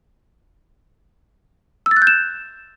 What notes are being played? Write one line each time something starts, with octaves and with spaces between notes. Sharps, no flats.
E6
A6
F#6
G6
E7